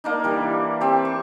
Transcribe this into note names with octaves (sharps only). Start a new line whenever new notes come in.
A#3 D4 D#4
E3 G3
C4 G4
C#6